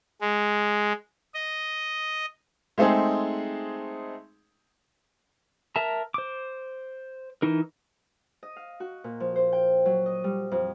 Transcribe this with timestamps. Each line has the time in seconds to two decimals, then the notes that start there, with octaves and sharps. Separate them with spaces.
0.21 G#3
1.34 D#5
2.78 G#3 A3 C4 D#4 G#4
5.76 A#4 E5 A5 A#5
6.14 C5 D6
7.42 E3 D#4 A#4
8.43 D#5
8.56 F5
8.80 F#4
9.04 A#2
9.20 F3
9.36 C5
9.53 G5
9.86 F#3
10.06 D#5
10.24 G3
10.51 F2